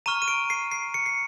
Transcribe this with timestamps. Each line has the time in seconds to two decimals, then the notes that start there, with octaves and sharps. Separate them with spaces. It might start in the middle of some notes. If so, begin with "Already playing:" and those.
0.06 A#5 C#6 F6 D#7
0.22 D#7
0.28 D7
0.50 C7
0.72 C7
0.94 C#7
1.06 C7